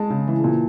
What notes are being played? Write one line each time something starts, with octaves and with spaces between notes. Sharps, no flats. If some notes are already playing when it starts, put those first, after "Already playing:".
Already playing: G#3 A5
C#3
E3
A#2